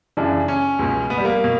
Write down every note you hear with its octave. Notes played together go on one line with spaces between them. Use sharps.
F#2 C#3 E3 D4
C#4
C#2 B2
B3
G3
A#3
B2